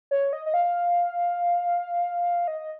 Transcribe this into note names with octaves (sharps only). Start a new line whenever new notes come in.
C#5
D#5
D#5
F5
D#5